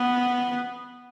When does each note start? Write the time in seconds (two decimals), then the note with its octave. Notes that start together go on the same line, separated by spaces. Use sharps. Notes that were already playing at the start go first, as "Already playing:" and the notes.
Already playing: B3